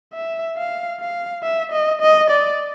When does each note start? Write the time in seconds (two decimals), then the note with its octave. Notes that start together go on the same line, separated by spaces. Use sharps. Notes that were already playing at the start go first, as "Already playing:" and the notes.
0.13 E5
0.57 F5
1.00 F5
1.43 E5
1.72 D#5
2.01 D#5
2.30 D5